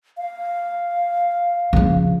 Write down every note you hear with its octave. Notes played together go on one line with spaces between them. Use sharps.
F5
C#3 F3